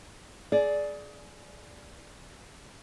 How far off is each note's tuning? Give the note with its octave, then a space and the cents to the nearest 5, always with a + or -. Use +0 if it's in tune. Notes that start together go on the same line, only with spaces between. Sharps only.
G#4 +25 D5 +0